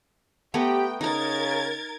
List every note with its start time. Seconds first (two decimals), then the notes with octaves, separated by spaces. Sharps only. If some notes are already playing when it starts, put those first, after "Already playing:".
0.54 A3 B3 G4 G5 A#5
1.01 C#3 D#4 A#4 A#5 G#6 A6